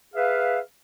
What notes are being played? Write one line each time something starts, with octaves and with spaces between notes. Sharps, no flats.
G#4 B4 E5 F5